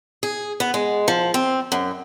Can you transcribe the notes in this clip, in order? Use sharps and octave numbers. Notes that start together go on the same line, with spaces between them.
G#4
B3
G#3
F3
C4
F#2